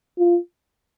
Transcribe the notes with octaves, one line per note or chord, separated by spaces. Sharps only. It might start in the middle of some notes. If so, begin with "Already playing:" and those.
F4